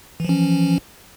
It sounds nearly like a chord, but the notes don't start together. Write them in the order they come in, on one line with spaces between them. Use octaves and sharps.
E3 F3 C#4